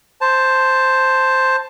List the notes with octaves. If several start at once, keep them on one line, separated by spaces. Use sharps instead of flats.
C5 A5